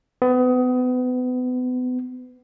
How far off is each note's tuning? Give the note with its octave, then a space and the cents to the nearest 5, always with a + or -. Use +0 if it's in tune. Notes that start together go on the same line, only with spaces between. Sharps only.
B3 +30